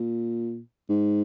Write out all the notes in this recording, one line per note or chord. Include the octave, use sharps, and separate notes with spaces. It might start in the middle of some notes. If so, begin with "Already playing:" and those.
Already playing: A#2
G#2